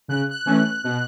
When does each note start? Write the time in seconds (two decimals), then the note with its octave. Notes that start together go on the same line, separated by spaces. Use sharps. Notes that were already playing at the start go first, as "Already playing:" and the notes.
0.08 C#3 F#6
0.31 F#6
0.46 E3 A3 C#4
0.84 B2